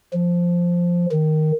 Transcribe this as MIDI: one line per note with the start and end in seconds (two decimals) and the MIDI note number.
0.13 1.06 53
1.12 1.52 51